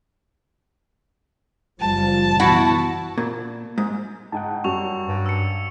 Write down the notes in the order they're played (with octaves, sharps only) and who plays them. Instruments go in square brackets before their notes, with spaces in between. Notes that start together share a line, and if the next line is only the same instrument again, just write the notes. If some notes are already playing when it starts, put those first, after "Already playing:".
[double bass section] F#1 F3 G3 [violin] A5
[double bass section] B2 E3 [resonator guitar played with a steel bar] E4 F#4 F#5
[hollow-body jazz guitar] A#2
G#2
[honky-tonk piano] G#2 [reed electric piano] F#5 G5 A5
[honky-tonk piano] F#2 G3 [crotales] C#6 F7
[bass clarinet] G2
[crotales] E6 C#7